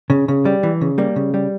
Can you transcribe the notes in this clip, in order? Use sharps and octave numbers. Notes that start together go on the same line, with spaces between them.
C#3
C#3
G3
E3
C#3
G3 A#3
C#3
G3